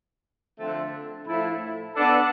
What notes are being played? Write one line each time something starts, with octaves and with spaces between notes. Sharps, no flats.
D3 F3 A3 C4
A2 F3 A3 E4
B3 D4 A4